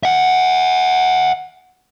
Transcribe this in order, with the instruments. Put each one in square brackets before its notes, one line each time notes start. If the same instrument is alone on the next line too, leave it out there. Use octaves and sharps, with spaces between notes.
[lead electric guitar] E5 F#5